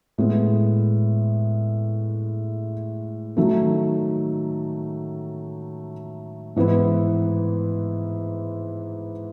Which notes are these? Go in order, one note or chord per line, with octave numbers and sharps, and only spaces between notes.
A2 G#3 B3
D#3 F#3 A3
G#2 E3 B3 E4